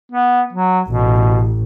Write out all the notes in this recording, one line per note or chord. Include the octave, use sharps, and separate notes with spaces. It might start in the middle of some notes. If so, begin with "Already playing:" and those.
B3
F#3
A1 B2